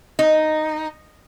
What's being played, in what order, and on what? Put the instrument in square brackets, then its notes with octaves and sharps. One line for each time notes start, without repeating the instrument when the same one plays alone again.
[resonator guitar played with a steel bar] D#4